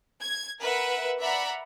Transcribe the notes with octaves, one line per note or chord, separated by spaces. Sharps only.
G#6
A#4 B4 E5 F#5
D5 E5 F#5 A#5 B5